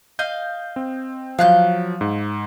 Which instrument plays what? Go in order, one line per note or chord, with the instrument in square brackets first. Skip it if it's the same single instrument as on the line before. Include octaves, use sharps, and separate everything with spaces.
[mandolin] D#5 F5 [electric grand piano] G6
[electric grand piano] C4
[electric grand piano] F3 F#3 [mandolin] F5 F#6 G6
[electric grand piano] G#2